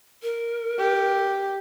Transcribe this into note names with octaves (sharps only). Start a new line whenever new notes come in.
A#4
G4